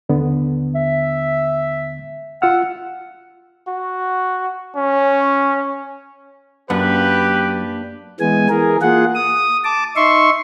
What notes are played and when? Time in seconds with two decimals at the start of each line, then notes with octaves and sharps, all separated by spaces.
0.09 D#2 D3 B3
0.75 E5
2.42 F4 F#5 E6 F6
3.68 F#4
4.76 C#4
6.70 F#2 A#3 D4 G4 B4 F#5
8.20 E3 G#3 B3 G#5
8.49 E3 G#4 A#4
8.81 A#3 F4 G#4 F#5
9.15 D#6
9.64 A5 D6
9.96 D#4 E5 C6 C#6